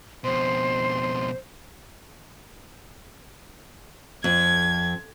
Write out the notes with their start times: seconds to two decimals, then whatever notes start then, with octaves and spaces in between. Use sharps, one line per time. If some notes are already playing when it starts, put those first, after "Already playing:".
0.24 F2 B2 C5 C6
4.24 F2 G#6